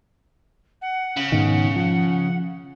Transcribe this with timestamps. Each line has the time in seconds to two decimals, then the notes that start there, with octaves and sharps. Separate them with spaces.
0.82 F#5
1.17 C#3
1.32 G#2 B2 D#3
1.76 F3